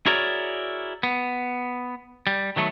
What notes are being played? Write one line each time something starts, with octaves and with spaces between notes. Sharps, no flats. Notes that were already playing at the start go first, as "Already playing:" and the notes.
E4 F#4 G#4 A#4 C#5 D5
B3
G3
D#3 F#3 A3 B3